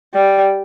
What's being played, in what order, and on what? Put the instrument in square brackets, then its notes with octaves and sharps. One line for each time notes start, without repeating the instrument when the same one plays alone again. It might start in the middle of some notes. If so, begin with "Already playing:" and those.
[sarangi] G3